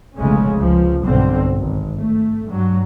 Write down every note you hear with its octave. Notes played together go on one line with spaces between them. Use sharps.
F1 B1 C#3 G#3 A3 C#4
C#2 F3
B1 G2 B2 D3 C4
G#1
A3
G2 F#3